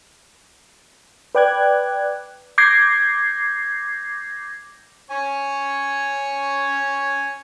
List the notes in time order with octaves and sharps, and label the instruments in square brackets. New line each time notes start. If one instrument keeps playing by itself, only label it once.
[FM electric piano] B4 D5 G5 D6 F#6 G#6
D6 G6 G#6 A#6 C7
[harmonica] C#5 G#5 C#6